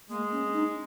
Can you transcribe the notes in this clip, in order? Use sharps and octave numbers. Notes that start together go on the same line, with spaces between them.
G#3 A#3
C#4
D#4